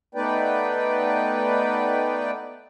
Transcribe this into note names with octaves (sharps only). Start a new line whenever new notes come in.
A3 B3 D#4 B4 D5 G5